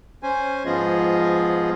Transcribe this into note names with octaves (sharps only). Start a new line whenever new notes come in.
C#4 C5 G#5
G#2 F3 B3 F4 G#4 D#5